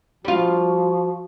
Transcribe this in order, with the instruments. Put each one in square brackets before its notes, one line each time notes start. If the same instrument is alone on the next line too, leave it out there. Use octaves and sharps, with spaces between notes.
[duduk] F3 [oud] G3 F4 [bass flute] F#4